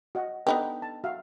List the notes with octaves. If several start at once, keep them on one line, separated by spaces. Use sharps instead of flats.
F#4 D#5 F#5
B3 D4 D#4 G4 A4 B4
A5
F#4 E5 F5